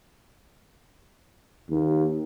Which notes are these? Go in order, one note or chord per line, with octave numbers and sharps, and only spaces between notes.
D#2